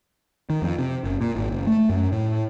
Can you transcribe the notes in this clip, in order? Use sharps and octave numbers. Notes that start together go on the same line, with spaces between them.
D#3
F2
C3
F#1
A#2
G#1
F#1
A3
F#2
A2